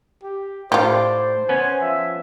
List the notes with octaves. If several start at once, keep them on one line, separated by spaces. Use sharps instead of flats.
G4
A2 F4 G4 C5 D5
B3 C#4 G#5
F3 E5